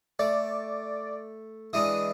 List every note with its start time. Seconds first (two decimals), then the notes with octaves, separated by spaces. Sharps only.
0.19 A3 D5
1.73 E3 G#3 D4 D#6